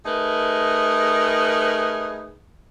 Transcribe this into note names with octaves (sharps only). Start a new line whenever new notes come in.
A3 D#4 G#4 A#4 B4